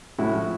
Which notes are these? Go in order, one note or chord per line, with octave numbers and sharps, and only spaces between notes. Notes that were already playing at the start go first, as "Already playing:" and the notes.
A2 E4 F#4
F3